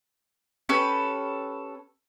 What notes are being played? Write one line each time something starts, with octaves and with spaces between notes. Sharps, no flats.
C#4 G4 A4 B4